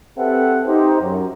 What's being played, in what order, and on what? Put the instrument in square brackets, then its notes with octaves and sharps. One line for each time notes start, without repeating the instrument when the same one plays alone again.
[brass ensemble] C4 G4 A4 B4 E5 F#5
D#4 G4 C5
F#2